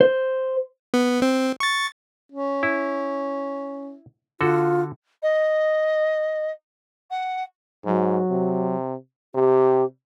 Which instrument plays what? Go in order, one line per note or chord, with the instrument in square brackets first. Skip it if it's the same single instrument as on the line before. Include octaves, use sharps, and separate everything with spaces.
[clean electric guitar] C5
[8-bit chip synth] B3
C4
C#6 A6
[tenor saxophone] C#4
[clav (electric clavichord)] E4
[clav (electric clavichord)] D3 F#4 A4 [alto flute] F4
[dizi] D#5
F#5
[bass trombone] G#2 [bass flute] F#3
[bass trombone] C3
[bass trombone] C3 [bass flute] G4